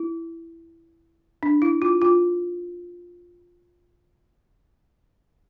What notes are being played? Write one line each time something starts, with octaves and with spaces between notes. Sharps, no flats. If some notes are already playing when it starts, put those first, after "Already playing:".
Already playing: E4
D4
E4
F4
F4